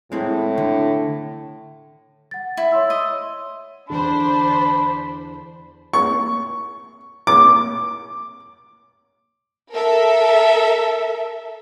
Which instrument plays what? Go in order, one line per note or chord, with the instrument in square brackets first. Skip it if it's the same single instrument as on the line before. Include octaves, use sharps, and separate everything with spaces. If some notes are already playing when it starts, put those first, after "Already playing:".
[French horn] A2 [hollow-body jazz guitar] G#3 C4 E4
[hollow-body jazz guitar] D3
[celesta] F#5 A6
[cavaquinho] E4
[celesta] C#5 C6 E6
[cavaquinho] D#5
[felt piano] E2 D3 [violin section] D4 C5 [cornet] B5
[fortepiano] C#6
D6
[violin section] A4 A#4 E5